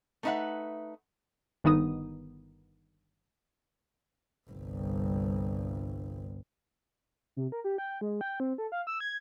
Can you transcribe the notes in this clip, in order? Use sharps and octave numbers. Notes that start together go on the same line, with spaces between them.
A3 B3 D#4 B4 E5 F#5
G1 D#3 B3 D#4 D#6
G1 C2
C3
A#4
G4
G5
G#3
G5
C4
A4
F5
E6
G#6